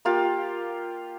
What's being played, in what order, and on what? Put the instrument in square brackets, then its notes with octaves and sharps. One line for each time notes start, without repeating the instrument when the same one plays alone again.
[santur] A#3 F4 G4